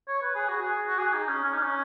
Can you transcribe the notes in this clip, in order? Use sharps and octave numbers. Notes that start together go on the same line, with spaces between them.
C#5
B4
G#4
F#4
G#4
F#4
G#4
D#4
C#4
C#4
D#4
C#4